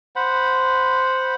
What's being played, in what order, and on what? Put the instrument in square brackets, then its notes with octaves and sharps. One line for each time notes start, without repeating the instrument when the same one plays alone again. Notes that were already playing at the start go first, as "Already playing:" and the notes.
[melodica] C5 F#5 B5